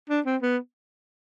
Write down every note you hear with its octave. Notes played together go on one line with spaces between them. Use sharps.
D4
C4
B3